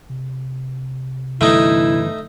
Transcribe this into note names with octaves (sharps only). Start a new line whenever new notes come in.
C3
G1 E3 A3 D#4 E4